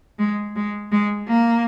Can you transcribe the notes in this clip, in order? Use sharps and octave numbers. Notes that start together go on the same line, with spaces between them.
G#3
G#3
G#3
A#3